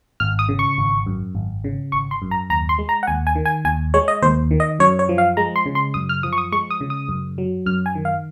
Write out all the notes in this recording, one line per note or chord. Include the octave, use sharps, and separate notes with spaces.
G#1 F6
D#6
C#3
C#6
G#1
F#2
G#1
C#3
G#1 C#6
C6
F#2
A#5
D#2 A#5
C6
G#3
A#5
F#5
D#2 G#5
G#5
D#3
G#5
D#2 G#5
G#3 C#5
D#5
D#2 C5
D#3
D#5
F#2 C#5
C#5
F3
F5
G#3 A#5
C6
C#3
C6
F#2 D#6
F6
F3 D#6
C#6
D#6
G#3 C#6
D#6
C#3
D#6
F#2
F#3
F#2 F6
G#5
D#3
F5